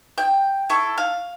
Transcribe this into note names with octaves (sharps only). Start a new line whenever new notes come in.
G5
E4 A4 C#6
F5